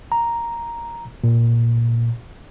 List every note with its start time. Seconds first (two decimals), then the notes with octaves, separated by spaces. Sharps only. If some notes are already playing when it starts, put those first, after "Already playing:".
0.12 A#5
1.24 A#2